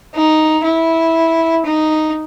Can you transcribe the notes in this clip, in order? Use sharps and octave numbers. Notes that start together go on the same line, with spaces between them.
D#4
E4
D#4